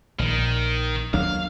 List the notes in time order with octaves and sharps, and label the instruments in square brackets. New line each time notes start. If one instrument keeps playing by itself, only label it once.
[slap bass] A#1 [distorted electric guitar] D#3
[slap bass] D#2 F#3 D4 [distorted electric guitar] F5